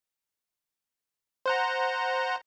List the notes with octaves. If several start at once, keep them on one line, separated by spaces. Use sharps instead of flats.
C5 F#5 A#5